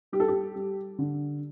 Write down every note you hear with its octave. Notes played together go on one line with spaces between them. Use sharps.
G3 G4
A4
G4
G3
D3